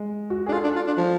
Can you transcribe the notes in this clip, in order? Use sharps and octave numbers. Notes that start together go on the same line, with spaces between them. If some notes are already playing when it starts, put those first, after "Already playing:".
Already playing: G#3
F#4
D4 G#4
F4 A4
D4
F4
D4
F3